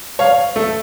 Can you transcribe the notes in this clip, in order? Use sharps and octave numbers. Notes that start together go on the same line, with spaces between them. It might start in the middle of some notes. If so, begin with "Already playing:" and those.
C#5 F5
A3